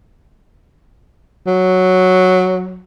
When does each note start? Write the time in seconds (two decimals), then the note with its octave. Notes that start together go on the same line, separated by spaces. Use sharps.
1.47 F#3